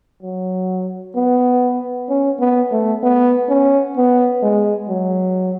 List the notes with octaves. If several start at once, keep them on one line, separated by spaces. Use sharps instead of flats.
F#3
B3
C#4
B3
A3
B3
C#4
B3
G#3
F#3